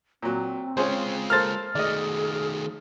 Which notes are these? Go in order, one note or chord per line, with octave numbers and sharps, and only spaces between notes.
A#2 F#3 C4
G#3 C#4 F4 G#4 C5
A#3 A4 C5 F6 A6
D#3 A3 G#4 D5 D#5